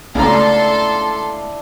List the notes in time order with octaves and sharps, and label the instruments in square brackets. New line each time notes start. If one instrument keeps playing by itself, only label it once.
[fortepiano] C#2 A#5 [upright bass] A3 B3 [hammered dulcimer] D4 E4 [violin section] A4 C6